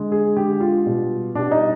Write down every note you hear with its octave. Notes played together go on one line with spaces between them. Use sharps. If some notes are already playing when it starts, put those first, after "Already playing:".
Already playing: D3 G#3
G#4
D3 G#3 G4
F4
B2 G3
B2 G3 D4
D#4